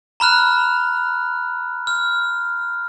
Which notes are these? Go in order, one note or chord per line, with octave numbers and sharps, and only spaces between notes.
A#5 B5 F6 F#6
F6